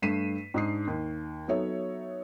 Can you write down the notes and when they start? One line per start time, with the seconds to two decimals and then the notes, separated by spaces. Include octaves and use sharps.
0.02 G2 A3 B6 C7 D#7 E7
0.54 G#2 D4 D#6 C7
0.87 D#2
1.48 F#3 B3 D#4 A4 C#5 E5